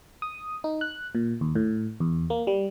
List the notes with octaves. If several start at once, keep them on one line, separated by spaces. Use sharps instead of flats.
D#6
D#4
F#6
A#2
D#2
A2
E2
A#3
G3